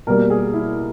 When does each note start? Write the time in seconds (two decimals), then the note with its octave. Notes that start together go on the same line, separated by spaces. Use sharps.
0.07 B2 G3 A#3 A#4
0.30 G#4
0.53 E4